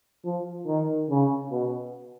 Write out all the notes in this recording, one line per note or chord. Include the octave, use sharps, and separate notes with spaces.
F3
D#3
C#3
B2